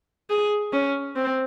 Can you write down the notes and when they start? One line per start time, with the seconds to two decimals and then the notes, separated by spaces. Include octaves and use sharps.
0.30 G#4
0.73 C#4
1.16 C4